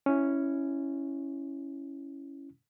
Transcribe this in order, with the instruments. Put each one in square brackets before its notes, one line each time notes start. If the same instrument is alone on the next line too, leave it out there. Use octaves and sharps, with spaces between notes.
[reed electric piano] C#4 E4